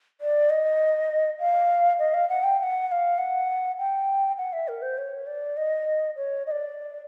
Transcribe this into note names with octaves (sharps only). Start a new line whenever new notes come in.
D5
D#5
F5
D#5
F5
F#5
G5
G5
F#5
F#5
F5
F#5
G5
F#5
E5
A#4
C5
C#5
D5
D#5
C#5
D#5
D5